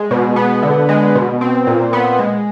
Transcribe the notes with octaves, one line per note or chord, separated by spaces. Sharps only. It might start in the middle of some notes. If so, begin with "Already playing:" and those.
Already playing: G#3
B2
B3
D3
G#3
B2
C4
A#2
B3
G#3